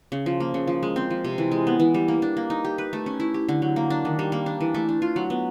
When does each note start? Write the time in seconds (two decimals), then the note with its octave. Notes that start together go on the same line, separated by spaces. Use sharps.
0.12 C#3
0.26 F3
0.40 A#3
0.54 C#3
0.67 F3
0.83 G#3
0.96 C4
1.10 F3
1.24 C3
1.38 E3
1.52 G#3
1.67 B3
1.80 E3
1.94 G3
2.08 A#3
2.22 D4
2.37 A#3
2.50 D#4
2.65 G4
2.78 B4
2.93 A3
3.06 C#4
3.20 E4
3.34 G4
3.49 D3
3.62 F#3
3.76 A#3
3.90 D4
4.05 D#3
4.19 G3
4.32 A#3
4.46 D4
4.61 E3
4.74 A3
4.89 D4
5.02 F4
5.16 F#3
5.30 B3